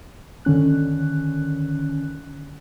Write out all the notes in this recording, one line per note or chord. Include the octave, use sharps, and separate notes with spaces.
D3 D#3 C#4 F#6